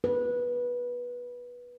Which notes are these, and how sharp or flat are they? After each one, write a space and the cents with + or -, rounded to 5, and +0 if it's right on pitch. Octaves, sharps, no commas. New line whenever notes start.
B4 -15